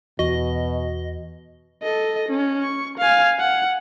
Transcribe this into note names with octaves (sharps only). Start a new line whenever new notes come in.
E2 B2 F#4 D#5
A4 D#5
C#4
C#6
F5 G#5
F#5